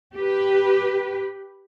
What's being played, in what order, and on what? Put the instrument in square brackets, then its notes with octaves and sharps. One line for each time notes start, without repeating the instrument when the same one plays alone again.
[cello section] G4 B4